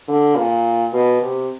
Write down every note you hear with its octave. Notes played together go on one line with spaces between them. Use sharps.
D3
A#2
B2
C3